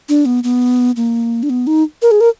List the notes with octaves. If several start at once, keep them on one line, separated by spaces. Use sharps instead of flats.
D4
B3
B3
A#3
D4
B3
D#4
A#4
G#4
A#4